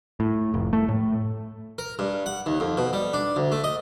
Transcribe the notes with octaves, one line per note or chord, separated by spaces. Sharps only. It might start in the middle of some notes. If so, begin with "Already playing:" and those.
A2
F1
A3
A2
A#4
G2
F#5
D#2
F2
B2
G3
D4
D2
A3
D#5